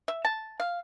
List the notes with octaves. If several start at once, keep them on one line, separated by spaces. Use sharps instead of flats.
E5
A5
F5